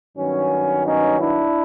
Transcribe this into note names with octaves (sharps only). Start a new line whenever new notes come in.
G2 D#3 F#3 B3 C#4
C#4 D#4
D4 E4